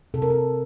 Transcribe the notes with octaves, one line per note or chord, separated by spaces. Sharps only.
C3 A4
A#4
A4